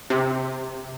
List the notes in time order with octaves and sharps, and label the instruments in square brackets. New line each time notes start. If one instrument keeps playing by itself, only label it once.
[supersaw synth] C3